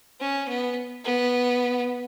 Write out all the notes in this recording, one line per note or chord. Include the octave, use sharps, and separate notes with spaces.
C#4
B3
B3